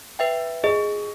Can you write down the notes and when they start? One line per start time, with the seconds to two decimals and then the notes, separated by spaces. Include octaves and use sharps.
0.19 B4 E5 G5
0.64 G#4 D#5